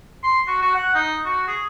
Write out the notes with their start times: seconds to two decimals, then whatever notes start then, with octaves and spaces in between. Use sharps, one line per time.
0.23 C6
0.47 F#4
0.62 F#4
0.74 F#5
0.95 D#4
1.25 F#4
1.48 G#4